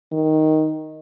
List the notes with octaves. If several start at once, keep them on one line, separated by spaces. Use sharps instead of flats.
D#3